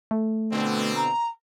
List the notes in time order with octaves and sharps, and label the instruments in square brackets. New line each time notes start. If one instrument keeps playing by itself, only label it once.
[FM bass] A3
[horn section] B2 D3 C4
[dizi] A#5